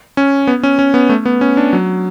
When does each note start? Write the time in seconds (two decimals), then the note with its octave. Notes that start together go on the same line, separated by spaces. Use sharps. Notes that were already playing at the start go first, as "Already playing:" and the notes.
0.17 C#4
0.47 B3
0.63 C#4
0.79 C#4
0.94 B3
1.09 A3
1.25 B3
1.41 C#4
1.57 D4
1.73 F#3